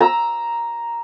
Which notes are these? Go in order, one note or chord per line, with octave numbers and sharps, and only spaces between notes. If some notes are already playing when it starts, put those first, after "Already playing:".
A#5 E6